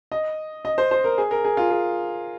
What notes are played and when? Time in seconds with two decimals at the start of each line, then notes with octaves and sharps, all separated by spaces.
0.12 D#5
0.65 D#5
0.78 C5
0.91 C5
1.04 A#4
1.18 G#4
1.31 A#4
1.44 G#4
1.57 F4
1.71 G#4